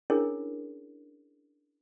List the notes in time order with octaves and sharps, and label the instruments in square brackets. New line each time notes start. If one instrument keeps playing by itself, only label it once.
[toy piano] C#4 D4 E4 G#4 A#4 C#5